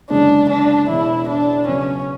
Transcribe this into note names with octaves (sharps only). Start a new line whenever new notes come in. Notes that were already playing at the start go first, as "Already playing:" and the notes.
F#1 E2 D3 G#3 C#4 D4
D4
E1 E2 B2 E4
D4
C#3 F#3 B3 C#4 D4